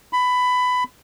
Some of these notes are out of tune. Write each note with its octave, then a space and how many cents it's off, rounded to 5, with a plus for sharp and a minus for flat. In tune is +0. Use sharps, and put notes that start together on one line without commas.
B5 +15